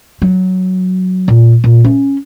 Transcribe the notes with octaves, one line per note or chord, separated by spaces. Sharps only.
F#3
A#2
A#2
C#4